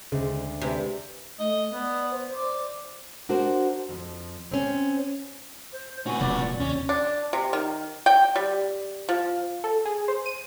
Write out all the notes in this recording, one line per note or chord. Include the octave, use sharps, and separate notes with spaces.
D2 G#2 C#3
C3 G#3 B4 D5
A3 D#5
B3 D5
C5
D5
D4 F#4 A#4 C5
F2 F3
C4 C#4
C5
A#2 F#4 G#5
E1 C3 F#3 D4
D5
D#2 C3 C#4
D4
C3
D#3
G5
G3
F3
A4
G#4
C5
D#7